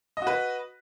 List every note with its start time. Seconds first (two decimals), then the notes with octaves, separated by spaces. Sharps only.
0.17 D#5
0.22 F#4
0.27 B4